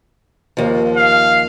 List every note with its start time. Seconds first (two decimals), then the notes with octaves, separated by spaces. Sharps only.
0.57 D#2 F3
0.97 F5